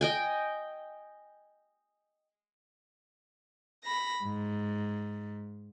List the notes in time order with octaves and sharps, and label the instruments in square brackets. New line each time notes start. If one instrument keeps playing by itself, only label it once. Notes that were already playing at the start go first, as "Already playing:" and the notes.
[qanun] D#5 G5 G#5
[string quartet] B5 A#6
G#2